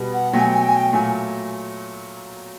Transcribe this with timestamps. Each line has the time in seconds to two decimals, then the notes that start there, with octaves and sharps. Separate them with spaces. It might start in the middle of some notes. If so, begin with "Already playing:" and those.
Already playing: B2 G3 B3
0.14 F#5
0.33 B2 F#3 A3 G5
0.40 G#5
0.48 G5
0.54 G#5
0.61 G5
0.68 G#5
0.75 G5
0.93 A#2 F#3 A3 G#5